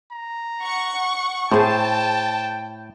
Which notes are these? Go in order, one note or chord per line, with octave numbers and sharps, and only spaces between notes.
A#5
F#5 C#6
A2 G#4 C5 G5 A5